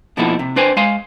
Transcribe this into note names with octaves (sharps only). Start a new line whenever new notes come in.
B2 F3 A#3 D#4 E4 A4
C3
D4 B4 C5 G5 G#5
G#3 F5 G#5 C6